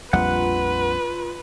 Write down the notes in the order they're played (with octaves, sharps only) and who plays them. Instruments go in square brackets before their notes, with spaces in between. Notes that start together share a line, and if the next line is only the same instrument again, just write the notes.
[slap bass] A#1 F2 G3 [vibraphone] F4 A#5 C6 [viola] B4 [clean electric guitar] F#5